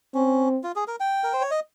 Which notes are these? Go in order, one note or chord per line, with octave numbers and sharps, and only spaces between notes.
C4 C#4
F4
G#4
A#4
G5
A#4
C5
C#5
D#5